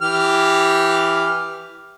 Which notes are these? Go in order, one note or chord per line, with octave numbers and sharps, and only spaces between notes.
E3 G4 F6